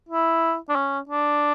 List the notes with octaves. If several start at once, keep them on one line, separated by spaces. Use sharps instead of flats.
E4
D4
C#4
D4